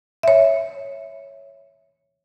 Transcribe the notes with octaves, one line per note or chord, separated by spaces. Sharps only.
C#5 E5